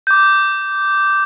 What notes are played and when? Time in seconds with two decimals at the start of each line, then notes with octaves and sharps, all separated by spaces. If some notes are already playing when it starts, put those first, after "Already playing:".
0.07 D6 G6